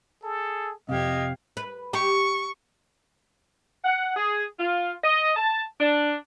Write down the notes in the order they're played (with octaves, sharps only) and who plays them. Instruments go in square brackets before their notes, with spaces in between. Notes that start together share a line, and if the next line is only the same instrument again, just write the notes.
[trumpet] G#4 [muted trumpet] A4
[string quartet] F2 G4 G#6 [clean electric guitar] C3 [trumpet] D#5 [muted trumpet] F5
[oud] B4
[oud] G4 [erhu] C#6
[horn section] F#5
G#4
F4
D#5
A5
D4